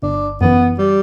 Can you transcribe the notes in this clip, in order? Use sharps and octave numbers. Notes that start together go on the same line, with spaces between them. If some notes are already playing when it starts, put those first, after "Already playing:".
G1 D4
F#2 E3 B3
G3